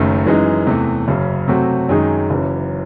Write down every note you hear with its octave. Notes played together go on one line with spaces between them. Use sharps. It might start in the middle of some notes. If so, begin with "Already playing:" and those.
Already playing: F#1 F#2 D#3 A3
F#2 E3 G#3 D#4
E2 C3 E3 A3
F#1 F#2 C#3
C3 F#3 A3 C4 F#4
F#2 D#3 G#3 D#4 G#4
F#1 F#2 E3